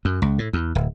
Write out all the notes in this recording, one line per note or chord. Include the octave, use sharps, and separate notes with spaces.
F#2
C#2
A2
E2
D1